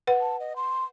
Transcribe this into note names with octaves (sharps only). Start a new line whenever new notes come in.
B4 F#5
A5
D#5
C6